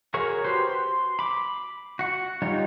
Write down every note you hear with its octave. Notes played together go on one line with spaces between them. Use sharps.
F#4 G#4 A#4 C#5 C#6
F#4 G4 B4 C5 C6
C6
B5 D6
F#4 F#5
G3 D#4 F4 C#5